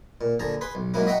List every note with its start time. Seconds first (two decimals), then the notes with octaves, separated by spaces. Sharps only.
0.21 A#2
0.39 A#1 D3 G#4 A5 A#5
0.61 G#4 B4 C6
0.75 B1
0.94 G#2 F#3 A#3 C#4 E4 F#4
1.06 F#4 D#5 E5 F#5 G5 A#5